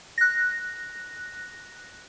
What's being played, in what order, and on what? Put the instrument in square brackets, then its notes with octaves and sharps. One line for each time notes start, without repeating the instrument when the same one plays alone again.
[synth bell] F#6 A#6